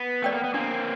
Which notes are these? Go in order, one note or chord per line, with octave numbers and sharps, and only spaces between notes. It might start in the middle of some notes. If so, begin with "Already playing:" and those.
Already playing: B3
A3 D5 G5
A#3
B3
A#3 C4 D4